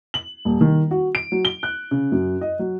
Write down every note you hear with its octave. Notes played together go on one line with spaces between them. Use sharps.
F#7
D#1
D#3
F#4
D7
F#3
G7
F#6
C#3
F#2
D#5
F#3